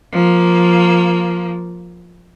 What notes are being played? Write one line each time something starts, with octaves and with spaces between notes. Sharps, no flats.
F3 A#3